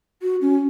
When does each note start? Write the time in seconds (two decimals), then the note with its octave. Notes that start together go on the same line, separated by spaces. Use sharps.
0.22 F#4
0.41 C#4